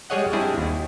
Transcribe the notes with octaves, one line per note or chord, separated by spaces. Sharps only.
G3 G#3 G#4 C#5 D#5 F#5
G3 C4 D4 E4 G#4
D#2